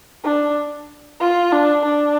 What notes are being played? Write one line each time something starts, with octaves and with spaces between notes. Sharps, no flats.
D4
F4
D4
D4